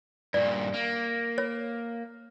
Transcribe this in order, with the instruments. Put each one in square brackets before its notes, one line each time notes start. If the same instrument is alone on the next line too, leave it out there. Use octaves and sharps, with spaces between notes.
[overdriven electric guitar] G2 A#2 [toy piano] D5
[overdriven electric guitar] A#3
[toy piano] C#5